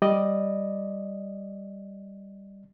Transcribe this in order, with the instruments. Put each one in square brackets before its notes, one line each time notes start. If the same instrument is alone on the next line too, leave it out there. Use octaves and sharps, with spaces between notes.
[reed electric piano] G3 D5 D#5